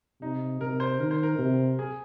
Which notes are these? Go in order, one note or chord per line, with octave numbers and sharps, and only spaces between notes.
C3 D#4
C3 A#4
C5
D#3 A#4
C5
A#4
C3
G#4